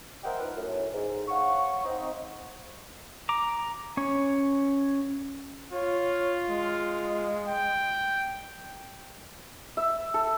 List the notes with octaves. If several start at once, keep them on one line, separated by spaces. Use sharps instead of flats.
A#4 C5 D#5 E5 F#5 G5
D#3 F3 D#4 E4 A#4 B4
F#2 A2
G#2
C#5 F5 F#5 C#6
C4 D#4
A#5 D6
C#4 C#5
F4 C#5
G#3
G5
E5
A4